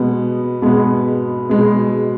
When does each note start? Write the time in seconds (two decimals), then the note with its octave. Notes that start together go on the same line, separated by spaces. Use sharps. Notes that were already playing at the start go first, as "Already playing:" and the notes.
Already playing: B2 G#3 B3
0.62 B2 G#3 B3
1.49 B2 G#3 B3